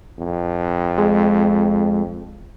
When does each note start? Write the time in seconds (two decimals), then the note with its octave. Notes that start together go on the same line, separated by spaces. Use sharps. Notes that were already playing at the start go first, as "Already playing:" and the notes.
0.18 F2
0.98 G#3